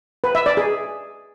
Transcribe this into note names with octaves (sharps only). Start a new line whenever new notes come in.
B4
E5
D5
G#4